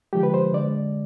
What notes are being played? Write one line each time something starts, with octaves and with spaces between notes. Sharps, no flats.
D3 F3 G#3 G4
B4
C5
D3 G#3 D5